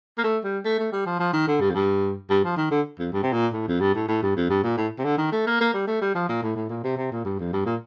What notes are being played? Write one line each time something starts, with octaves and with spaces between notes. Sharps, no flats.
A#3
A3
G3
A3
A3
G3
F3
F3
D#3
D3
G2
F2
G2
G2
F3
D#3
D3
F2
G2
C3
A#2
A2
F2
G2
A2
A2
G2
F2
G2
A#2
A2
C3
D3
D#3
A3
A#3
A#3
G3
A3
G3
F3
A#2
A2
A2
A#2
C3
C3
A#2
G2
F2
G2
A#2